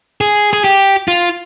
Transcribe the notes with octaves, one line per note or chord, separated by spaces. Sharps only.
G#4
G#4
G4
F4